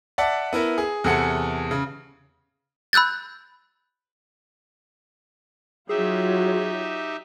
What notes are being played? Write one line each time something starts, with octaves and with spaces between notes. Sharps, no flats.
D5 E5 F#5 A5
B3 E4 A#4
G#4
E2 C3 G#4 A4 F#5 C#7
C#3
B5 E6 F#6 G6 A6
F#3 D#4 F4 G4 G#4 E5